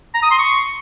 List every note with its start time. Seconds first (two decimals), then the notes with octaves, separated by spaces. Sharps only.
0.14 A#5
0.22 D#6
0.31 C6
0.39 C#6